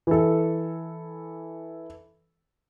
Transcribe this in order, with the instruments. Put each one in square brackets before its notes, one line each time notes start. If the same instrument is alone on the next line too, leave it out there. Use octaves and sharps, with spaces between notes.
[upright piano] E3 A4